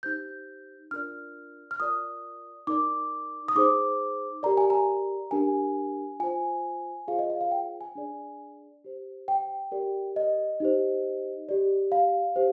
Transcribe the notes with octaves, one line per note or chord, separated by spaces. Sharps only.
D#4 G4 C5 G6
D4 F4 A#4 D5 F6
F6
F4 A#4 D5 D#6
D#4 A#4 D5 D6
D#6
D#4 G#4 C5 D6
G4 A#4 D5 A#5
G#5
A#5
D4 G4 A#4 G#5
F4 C5 G#5
F4 G#4 C5 F5
D#5
F5
F5
G5
G#5
D4 G#4 D5
G4 C5
G5
G4 A#4 D5
D#5
D#4 G4 C5
G4 D5
F5
G4 C5